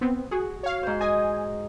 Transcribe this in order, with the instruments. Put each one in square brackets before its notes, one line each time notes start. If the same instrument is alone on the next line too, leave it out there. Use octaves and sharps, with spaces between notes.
[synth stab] B3 C4
[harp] F#4 [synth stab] G#4
[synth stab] C#5 F5
[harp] G#2 C5
[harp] D#5 [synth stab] G#5